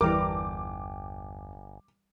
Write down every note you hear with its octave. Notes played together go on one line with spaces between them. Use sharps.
G1 E2 E3 G3 A#4 G5 D6